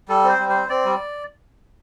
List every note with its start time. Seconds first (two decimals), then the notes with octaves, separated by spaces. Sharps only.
0.08 G3 A4
0.24 C4
0.29 C5
0.39 G3
0.49 C5
0.54 C4
0.69 C4 D5
0.85 G3